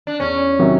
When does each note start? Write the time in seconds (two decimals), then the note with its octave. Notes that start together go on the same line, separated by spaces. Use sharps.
0.07 D4
0.20 E2 C#4
0.59 C3 D#3 F#3